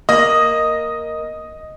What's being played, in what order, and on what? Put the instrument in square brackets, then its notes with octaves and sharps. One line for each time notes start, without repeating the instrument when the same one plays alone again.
[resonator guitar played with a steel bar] A#3 [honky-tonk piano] D#5